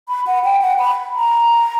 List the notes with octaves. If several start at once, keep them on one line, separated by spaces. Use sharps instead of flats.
B5
F#5
G5
F#5
B5
A#5